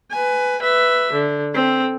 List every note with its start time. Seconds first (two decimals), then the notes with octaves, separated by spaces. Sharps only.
0.11 B4 G#5
0.61 B4 E5
1.12 D3
1.53 C4 A4